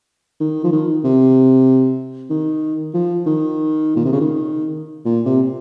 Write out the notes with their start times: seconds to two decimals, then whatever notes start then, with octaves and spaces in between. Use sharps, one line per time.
0.40 D#3
0.64 F3
0.72 D#3
1.04 C3
2.30 D#3
2.94 F3
3.26 D#3
3.96 A#2
4.05 C3
4.13 C#3
4.20 D#3
5.05 A#2
5.26 C3